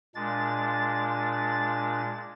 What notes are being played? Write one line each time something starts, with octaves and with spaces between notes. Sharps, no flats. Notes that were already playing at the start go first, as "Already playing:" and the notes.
A#2 G#3 D4 A6